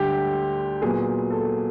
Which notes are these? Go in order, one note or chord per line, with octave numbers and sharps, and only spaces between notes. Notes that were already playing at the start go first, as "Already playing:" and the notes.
Already playing: D2 D3 G3 G4
A#2 F#3 B3 G#4
A4